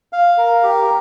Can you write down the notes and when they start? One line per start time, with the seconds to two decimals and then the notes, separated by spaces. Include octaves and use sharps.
0.13 F5
0.38 A#4
0.63 G4